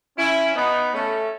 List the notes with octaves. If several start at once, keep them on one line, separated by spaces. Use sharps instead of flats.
C#4 E4
B3 D#4
A3 C#4